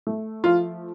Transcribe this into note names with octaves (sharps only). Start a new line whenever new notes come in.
A3
F3 F4